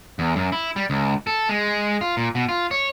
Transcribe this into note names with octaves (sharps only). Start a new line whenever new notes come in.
E2
F#2
E4
G3
C#2
A4
G#3
F4
A#2
B2
F4
C#5